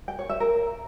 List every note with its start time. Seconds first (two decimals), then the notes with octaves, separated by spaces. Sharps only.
0.08 G5
0.19 C#5
0.30 E5
0.40 A#4